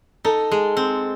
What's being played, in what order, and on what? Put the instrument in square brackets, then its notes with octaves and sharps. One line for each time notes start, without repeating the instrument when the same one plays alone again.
[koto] D#4 [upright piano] A4
[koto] G#3
C4